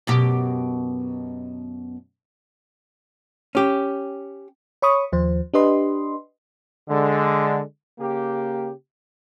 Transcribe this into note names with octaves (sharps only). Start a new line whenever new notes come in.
F#2 B2 G4
C#4 G4
C#5 B5 C#6 D#6
D#2 F3 C5
D4 G4 B4 D#5 C6
D3 G#3
C#3 A#3 G4